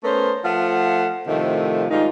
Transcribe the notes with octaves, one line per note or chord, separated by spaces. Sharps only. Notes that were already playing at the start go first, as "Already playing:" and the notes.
A3 B3 C#4 A#4 C5
F3 A3 F5 F#5
A2 C3 D#3 F3 A3
G#2 D#3 G3 D#4 F4